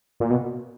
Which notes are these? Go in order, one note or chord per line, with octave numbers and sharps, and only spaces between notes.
A#2
B2